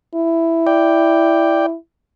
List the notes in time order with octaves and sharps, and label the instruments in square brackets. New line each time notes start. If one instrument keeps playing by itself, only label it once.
[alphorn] E4
[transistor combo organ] D5 G5